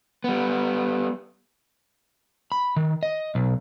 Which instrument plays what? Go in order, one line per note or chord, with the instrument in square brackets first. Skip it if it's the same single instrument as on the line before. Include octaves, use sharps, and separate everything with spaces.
[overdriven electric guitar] G3 B3
[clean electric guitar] B5
D#3
D#5
B1